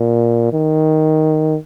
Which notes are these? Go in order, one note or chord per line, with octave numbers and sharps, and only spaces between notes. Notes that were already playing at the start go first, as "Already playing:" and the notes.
Already playing: A#2
D#3